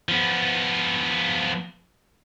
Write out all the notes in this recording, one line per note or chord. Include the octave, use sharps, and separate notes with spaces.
F3 B3